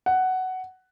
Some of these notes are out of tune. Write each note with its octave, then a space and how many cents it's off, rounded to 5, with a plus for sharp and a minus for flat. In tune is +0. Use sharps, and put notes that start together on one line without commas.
F#5 +10